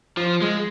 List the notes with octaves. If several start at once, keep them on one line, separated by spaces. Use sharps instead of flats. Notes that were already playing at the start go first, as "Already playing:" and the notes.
F3
G#3